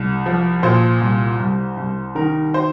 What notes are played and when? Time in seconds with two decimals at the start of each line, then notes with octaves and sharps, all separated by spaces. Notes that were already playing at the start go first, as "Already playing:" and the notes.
Already playing: C2
0.26 F3
0.63 A#2 C5
1.01 C2
1.40 C2
1.77 C2
2.15 D#3 A#4
2.54 C5